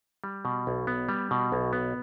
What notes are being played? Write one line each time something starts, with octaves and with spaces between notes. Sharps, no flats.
G3
B2
B1
B3
G3
B2
B1
B3